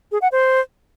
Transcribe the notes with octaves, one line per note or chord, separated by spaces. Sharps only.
G#4
F#5
C5